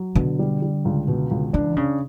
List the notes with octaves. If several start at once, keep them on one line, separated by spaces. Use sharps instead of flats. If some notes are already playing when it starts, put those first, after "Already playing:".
Already playing: F#3
B2 D3
G3
G3
C#2
B2
C#2
E3 D4
C#3 D4